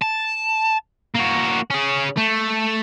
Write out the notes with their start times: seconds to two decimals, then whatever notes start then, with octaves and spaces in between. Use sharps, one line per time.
0.02 A5
1.15 A#3 F#4
1.71 C#4 G#4
2.18 A3